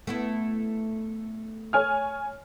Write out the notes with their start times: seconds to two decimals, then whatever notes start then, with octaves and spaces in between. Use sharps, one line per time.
0.07 A3 B3 E4
1.73 C#5 G#5 F6